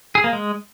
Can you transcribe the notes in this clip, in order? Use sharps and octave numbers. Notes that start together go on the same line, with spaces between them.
G#4
A#3
G#3